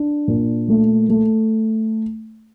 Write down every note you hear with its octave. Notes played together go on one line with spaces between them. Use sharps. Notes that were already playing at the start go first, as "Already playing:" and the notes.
Already playing: D4
A#2
A3
A3